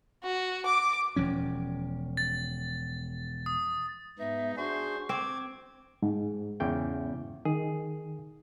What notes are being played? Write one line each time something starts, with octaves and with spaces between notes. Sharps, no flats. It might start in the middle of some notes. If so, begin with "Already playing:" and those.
F#4
D6
E1 F3 C#4
A6
D#6
G#2 B3 D#4 E5
D4 F#4 G#4 C5 C#6
C4 D6 G#6
G#2
E2 C#3 G5
D#3 G#4